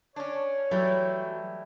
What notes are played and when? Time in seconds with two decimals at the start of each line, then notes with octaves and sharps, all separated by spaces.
0.16 C#4 D4 C#5
0.71 E3 F#3 G3 A3